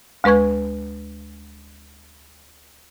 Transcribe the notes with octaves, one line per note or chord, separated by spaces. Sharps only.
D2 G#3 B4 C#6 G#6